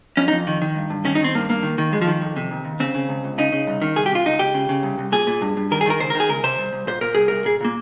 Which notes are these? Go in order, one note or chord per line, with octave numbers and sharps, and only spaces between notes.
F2 C#4
D#4
F2
D#3
D#3
G2
G2
D#3 C#4
D#4
D#3 C4
G2 A#3
G2 A#3
D#3
D#3
F2 G#3
F3
D#3
F2
C3
D#2
D#2
C#3 C4
C#3
C#2
C#2
C#3 D#4
C#3
C2
D#3
C2 G#4
G4
C3 F4
C#2 D#4
C#2 G4
C#3
C#3
C2
C2
A#2 G#4
A#2
G2
G2
D#3 A#4
G#4
D#3 A#4
C#2 C5
A#4
D#3 G#4
C#2 A#4
C3 C5
C2
C2
A#2 C5
A#2 A#4
C2 G#4
C2 A#4
A#2 G#4
A#2 A#3